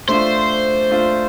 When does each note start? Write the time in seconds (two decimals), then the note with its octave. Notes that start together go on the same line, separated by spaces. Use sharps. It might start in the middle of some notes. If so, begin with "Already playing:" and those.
0.09 A3 D4 F4 C5
0.91 A3 D4 F4